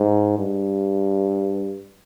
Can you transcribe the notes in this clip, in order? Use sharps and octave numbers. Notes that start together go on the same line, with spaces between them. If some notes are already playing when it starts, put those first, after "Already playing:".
Already playing: G#2
G2